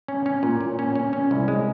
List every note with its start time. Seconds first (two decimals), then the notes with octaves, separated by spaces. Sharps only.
0.08 C#4
0.26 C#4
0.43 A#2
0.61 A#2
0.79 C#4
0.95 C#4
1.13 C#4
1.31 C2
1.48 G#3